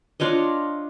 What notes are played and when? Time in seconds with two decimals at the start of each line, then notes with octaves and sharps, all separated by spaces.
0.20 D4 F4 C#5 D#5